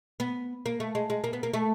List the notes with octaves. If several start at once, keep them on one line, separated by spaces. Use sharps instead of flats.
B3
A#3
A3
G#3
G#3
A#3
B3
A#3
A3